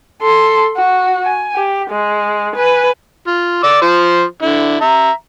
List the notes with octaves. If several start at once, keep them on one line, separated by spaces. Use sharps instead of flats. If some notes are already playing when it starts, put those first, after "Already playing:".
A4 C6
F#4
G#5
G4
G#3
B4 G#5
F4
D5 D6 E6
F3 C5
D3 E4
E5 A#5